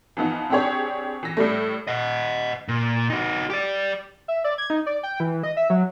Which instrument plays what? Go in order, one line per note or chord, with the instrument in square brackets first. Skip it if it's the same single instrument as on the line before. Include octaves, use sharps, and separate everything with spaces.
[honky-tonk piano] E3 F3 B3 D#4
C4 D4 G4 G#4 C#5
E3 A#6
A2 G3 A3
[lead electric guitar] D#5 F#5
A#2
D#4 F#4
G4 D5
[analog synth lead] E5
D5
G#6
D#4
D5
G5
E3
D#5
E5
F#3